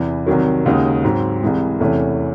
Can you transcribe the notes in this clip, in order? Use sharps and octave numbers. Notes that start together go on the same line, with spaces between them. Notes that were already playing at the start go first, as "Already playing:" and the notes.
Already playing: E2 C3 E3
C2 C3 D#3 F#3
D#2 C#3 G#3 D#4 F#4
G#2 F#3 C4
C2 C3 E3 G#3
E2 C3 E3 A3 C#4